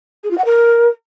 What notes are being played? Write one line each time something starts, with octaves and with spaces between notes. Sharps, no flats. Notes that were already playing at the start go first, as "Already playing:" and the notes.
G#4
F4
F#5
A#4